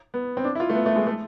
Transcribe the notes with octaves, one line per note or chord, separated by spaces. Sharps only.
B3
C4
D4
E4
F4
A3
B3
A3
G#3
A3